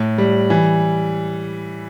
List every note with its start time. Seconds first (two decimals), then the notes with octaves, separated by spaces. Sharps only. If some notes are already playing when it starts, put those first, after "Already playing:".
Already playing: A2
0.18 G3
0.50 E3